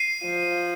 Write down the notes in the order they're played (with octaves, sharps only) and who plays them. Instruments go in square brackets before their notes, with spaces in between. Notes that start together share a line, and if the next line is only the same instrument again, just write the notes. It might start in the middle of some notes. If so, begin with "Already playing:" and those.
Already playing: [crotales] C7 D#7
[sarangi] F3